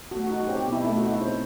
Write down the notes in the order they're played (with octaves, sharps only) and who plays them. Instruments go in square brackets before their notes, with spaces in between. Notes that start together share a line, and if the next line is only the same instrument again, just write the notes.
[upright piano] A3 [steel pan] F#4
[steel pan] F#4
[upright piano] D#4
[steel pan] F#4
[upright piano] C4 [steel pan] G4
[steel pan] G4
[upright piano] B2
[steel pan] E4
[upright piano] A3 [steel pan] E4
[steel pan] F#4
[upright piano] D#4
[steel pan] E4
[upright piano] C4